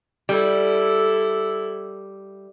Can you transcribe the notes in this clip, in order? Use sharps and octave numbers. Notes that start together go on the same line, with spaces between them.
G3 E4 A4